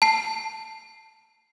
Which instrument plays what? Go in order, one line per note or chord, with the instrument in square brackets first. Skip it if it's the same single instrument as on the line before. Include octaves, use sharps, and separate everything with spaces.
[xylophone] A5 C7